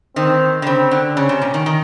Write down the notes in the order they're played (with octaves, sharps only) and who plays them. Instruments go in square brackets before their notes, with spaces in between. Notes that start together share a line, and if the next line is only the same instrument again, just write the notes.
[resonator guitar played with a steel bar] D#3 [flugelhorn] C4
[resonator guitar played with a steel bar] D3
[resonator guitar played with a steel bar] C#3 [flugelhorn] C4
[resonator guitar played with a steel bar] D3
[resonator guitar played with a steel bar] C#3 [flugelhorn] C#4
[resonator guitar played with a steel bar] C3
A#2
D#3
D#3